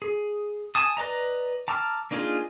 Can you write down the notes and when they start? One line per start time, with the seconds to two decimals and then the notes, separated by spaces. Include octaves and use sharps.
0.02 G#4
0.75 G#5 A5 D#6
0.97 B4 D5 D#5 A#5
1.68 A5 A#5 D6 E6 F6
2.11 A#3 D4 D#4 F4 G#4